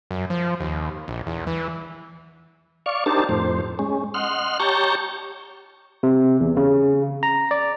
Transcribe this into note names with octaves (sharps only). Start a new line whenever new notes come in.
F#2
F3
D#2
A#1
E2
E3
D5 F5 C#6
D4 D#4 G4 A#4 C5 A5
F2 A2 C5
G#3 C#4
D#5 F#5 C6 F6
G4 C#5 A5 A#5 C#6 G6
C3
E2
C#3
A#5
D5